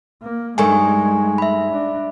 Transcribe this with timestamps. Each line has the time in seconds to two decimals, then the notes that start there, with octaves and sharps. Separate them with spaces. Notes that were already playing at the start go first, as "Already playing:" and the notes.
0.22 A#3
0.58 G2 D#3 G#3 A3 G#5 C#6
1.38 E5 B5
1.72 D4